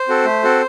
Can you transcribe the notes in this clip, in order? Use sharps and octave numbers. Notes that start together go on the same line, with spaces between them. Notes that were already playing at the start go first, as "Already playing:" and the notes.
Already playing: C5
C4 F#4 A4
A3
C4 F#4 A4